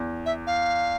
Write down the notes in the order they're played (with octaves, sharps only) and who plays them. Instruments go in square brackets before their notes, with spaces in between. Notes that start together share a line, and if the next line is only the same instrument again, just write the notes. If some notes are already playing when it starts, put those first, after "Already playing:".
Already playing: [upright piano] E2
[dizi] E5
F5